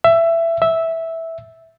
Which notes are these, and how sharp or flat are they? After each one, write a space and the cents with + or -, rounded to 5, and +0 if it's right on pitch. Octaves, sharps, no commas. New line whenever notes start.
E5 +15
E5 -10